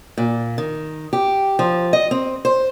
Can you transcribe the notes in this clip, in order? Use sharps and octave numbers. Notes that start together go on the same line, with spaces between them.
A#2
D#3
G4
F3
D#5
C4
C5